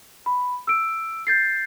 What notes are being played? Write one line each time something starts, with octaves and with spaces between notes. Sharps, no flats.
B5
E6 D7
G6 A6 C7